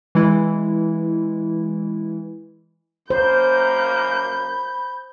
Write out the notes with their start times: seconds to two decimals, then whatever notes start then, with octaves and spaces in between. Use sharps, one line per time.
0.15 E3 G#3 E4
3.10 F#2 A#3 C5 B5 G6